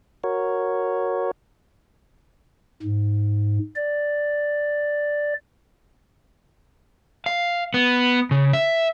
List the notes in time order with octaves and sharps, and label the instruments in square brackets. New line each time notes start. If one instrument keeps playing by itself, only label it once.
[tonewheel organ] F#4 A#4 C#5
[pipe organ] G#2
D5
[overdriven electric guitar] F5
B3
C#3
E5